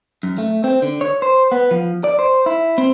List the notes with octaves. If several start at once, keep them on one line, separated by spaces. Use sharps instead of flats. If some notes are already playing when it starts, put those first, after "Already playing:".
F#2
A3
C4
D3
C#5
C5
B3
F3
D5
C5
E4
C4